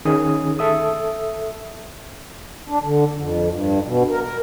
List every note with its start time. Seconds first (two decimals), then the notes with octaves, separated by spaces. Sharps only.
0.05 D#3 C#4 G#4 D#6
0.59 A4 E5 D#6
2.69 D4
2.83 D3
3.18 F2
3.49 G2
3.86 B2
4.10 A#4
4.23 A#4